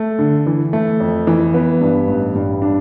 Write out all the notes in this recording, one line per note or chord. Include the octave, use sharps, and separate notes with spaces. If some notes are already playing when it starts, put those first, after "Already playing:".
Already playing: A3
D3
E3
A3
F2
E3
B3
G2
A1
G2
D4